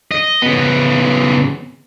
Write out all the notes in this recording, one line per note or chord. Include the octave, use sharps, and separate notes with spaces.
D#5
C#3 B3